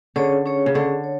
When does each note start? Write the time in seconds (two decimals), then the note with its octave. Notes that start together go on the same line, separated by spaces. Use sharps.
0.16 D3 C#4 G#4 C#5
0.46 C#4 G#4 C#5
0.66 C#3
0.75 D3 C#4 G#4 C#5
1.04 C#5